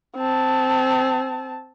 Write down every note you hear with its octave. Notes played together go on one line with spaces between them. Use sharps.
C4 A5